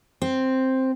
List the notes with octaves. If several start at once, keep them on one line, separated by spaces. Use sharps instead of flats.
C4